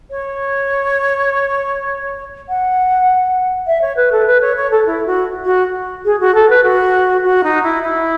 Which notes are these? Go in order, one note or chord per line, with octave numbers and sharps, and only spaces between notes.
C#5
F#5
E5
C#5
B4
A4
B4
C#5
C#5
A4
E4
F#4
F#4
G#4
F#4
A4
B4
F#4
F#4
D#4
E4
E4